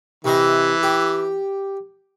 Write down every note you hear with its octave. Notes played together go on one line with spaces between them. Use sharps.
C3 E3 C5 D#5
G4